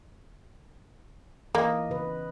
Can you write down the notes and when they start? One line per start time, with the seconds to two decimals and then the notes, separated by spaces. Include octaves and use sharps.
1.55 E3 A#3 D#5
1.90 C#3 B4